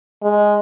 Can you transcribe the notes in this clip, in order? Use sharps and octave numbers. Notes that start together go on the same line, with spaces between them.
G#3